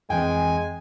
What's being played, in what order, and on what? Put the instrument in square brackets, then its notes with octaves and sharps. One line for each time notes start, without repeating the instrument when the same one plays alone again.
[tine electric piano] F2 E3 C4 [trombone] G#3 [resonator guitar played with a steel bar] G5 [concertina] G#5